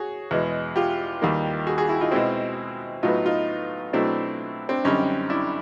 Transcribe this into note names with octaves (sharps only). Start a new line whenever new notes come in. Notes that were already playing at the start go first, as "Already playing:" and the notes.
Already playing: F#4 G#4 C#5
E2 B2 G#3
F4 G4
D#2 D#3 G3 A#3
F#4 G#4
F#4 G#4
E4 F#4
D#4 F4
B2 G#3 C4 E4 F#4
A2 F#3 B3 D#4 F4
D#4 F4
B2 F#3 A3 C4 D4 E4
C4 D4
F#2 D3 G3 C4 C#4 D#4
D4 E4